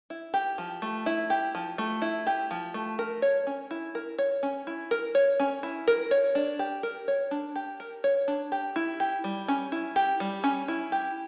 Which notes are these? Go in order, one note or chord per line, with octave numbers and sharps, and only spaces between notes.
E4
G4
F3
A3
E4
G4
F3
A3
E4
G4
F3
A3
A#4
C#5
C#4
E4
A#4
C#5
C#4
E4
A#4
C#5
C#4
E4
A#4
C#5
D4
G4
A#4
C#5
D4
G4
A#4
C#5
D4
G4
E4
G4
G3
C#4
E4
G4
G3
C#4
E4
G4